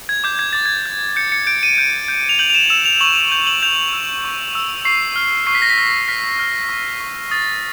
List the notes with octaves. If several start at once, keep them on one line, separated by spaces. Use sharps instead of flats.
G#6
D6 G6
G#6
D6 A6
G#6
G6
G6 C#7
C#7
G6 D7
D#7
G6
G6
F7
G6 F#7
F7
E7
E6 E7
F7
C#6 F#7
F7
G6 F7
F#7
G6 F7
E6
C#6
E6
C#6 C7
F6
C#6 C7
B6
A#6
B6
F6
F6 B6
F6
C#6
C#6
D#6 A6